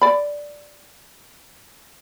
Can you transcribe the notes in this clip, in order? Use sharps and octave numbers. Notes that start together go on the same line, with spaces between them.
D5 B5